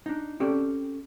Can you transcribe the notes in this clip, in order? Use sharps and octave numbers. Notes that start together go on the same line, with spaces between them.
D4 D#4
C4 C#4 G4 A4 D5